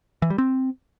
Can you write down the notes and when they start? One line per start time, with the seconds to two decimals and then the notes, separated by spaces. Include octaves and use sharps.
0.22 E3
0.30 G3
0.38 C4